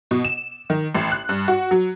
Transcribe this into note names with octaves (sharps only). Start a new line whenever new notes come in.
B2
E7
D#3
A1
F#6
G2
F#4
F#3